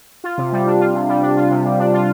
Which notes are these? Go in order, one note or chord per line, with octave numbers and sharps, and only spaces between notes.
F4
C3
G3
D4
F4
C3
G3
D4
F4
C3
G3
D4
F4